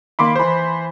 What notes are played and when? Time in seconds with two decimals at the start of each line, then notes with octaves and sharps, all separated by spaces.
0.19 D#3 A#3 B5 C6 D6
0.36 E3 C5 B5 C6